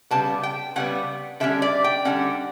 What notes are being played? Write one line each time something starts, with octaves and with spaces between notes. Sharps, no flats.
C#3 G3 B3 A5
G5
C#3 G3 B3 F#5
D3 G3 C#4 E5
D5
G5
D3 G3 C#4 F#5